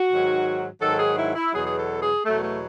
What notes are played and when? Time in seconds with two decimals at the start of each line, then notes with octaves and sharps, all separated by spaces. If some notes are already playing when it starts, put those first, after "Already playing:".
Already playing: F#4
0.10 G#2 D#3 F#3
0.81 G#2 D#3 F#3 A4
0.99 G#4
1.17 E4
1.35 E4
1.53 E2 B2 F#3 G#4
1.65 G#4
1.77 A4
2.01 G#4
2.24 E2 B2 F#3 A3
2.43 A3